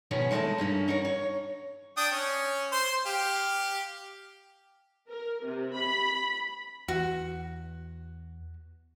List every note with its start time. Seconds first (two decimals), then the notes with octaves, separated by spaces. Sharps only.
0.11 B2 D#3 F3 B3 C#4 G#4
0.31 D#3 G#3 A3 D5 D#5 A5
0.58 G2 D#3 A#3 C#4
0.88 C#4 D#4 F#4 A#4 C#5
1.05 C#5
1.97 D4 G5 D#6
2.11 C#4
2.72 C5 C6
3.06 G4 F5
5.08 A#4
5.45 C3
5.76 B5
6.88 E2 F#4